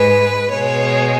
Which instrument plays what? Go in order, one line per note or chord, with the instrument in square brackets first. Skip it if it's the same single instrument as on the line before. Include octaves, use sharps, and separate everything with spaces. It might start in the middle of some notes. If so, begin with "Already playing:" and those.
Already playing: [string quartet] G#2 G#3 B4
B2 G#3 C#5